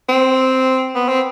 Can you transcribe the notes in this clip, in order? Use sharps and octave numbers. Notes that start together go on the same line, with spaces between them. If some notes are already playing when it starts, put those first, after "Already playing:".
C4
B3
C4